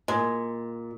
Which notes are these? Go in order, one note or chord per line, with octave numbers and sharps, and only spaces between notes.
A#2 G#3